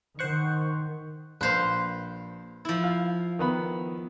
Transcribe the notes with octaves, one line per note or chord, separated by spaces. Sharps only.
D#3 C5 F#5 C#6
A#1 B4 C5 F5
F3 E4
F5
D#3 B3 B5